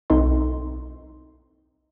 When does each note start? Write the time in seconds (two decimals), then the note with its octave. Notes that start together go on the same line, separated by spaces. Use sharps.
0.10 B1 C4 D#4 A4 D#5 C6